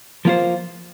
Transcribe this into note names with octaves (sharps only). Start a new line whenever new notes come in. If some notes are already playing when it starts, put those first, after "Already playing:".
F3 A#3 F4 C5